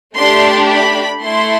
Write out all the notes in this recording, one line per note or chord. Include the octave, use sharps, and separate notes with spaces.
A3 D4 G4 C6
B5
A3 E4 A4 C6